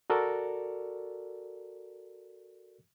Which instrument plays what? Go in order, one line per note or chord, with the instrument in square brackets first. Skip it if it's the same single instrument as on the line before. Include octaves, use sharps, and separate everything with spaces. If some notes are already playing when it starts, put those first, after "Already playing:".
[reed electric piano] F#4 A4 A#4 D5